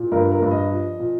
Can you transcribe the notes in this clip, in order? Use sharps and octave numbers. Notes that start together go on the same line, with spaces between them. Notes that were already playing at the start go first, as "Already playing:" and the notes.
Already playing: A#2
G2 A#4
A#4
G2
D#5
F3
A#2